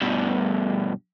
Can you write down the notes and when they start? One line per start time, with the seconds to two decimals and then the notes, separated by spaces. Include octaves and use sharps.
0.01 G2 B2